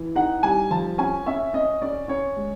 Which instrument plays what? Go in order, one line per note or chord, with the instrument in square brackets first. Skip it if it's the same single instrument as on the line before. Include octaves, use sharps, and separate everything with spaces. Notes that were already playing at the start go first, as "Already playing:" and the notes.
Already playing: [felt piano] E3
[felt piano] D#4 [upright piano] F#5
[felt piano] G3 [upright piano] G#5
[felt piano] F3 [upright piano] A5
[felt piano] C#4 [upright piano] G#5
[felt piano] C#4 [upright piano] E5
[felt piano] C#4 [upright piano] D#5
[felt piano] C#4 [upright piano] D5
[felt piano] C#4 [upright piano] C#5
[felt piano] G#3